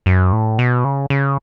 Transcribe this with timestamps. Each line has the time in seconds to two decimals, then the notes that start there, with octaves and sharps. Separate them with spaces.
0.06 F#2
0.33 A2
0.59 B2
0.84 C#3
1.10 C#3